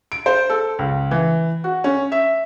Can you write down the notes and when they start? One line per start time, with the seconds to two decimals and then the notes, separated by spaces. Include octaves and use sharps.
0.12 D7
0.26 C5
0.50 A4
0.79 C#2
1.11 E3
1.64 F#4
1.84 C#4
2.12 E5